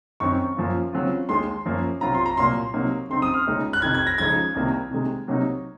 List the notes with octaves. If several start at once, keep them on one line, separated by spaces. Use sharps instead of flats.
F#2 D#3 F#3 C4 C#6
F#2 F3 A#3 F4
C#3 F#3 C4 F4
D#2 D#3 G#3 C6
F#2 F3 A#3 C#4
C3 F#3 C4 F4 A#5
C6
A#5
C2 A#2 F#3 A#3 C6
C3 F#3 A#3 D#4
C#3 F#3 C4 D#4 C6
D#6
F6
C#2 C#3 G#3 D#4
F#6
F2 C3 D#3 G#6
G#6
A#6
C#3 F3 G#3 D#4 G#6
C2 C3 D#3 A#3
C3 D#3 G#3
C3 F#3 A#3 D#4